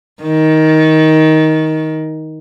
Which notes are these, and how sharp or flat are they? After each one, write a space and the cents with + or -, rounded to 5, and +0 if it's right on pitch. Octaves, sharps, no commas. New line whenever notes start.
D#3 +15